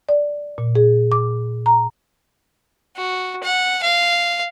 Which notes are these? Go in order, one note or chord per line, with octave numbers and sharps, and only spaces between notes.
D5
A#2
G#4
D6
A#5
F#4
F#5
F5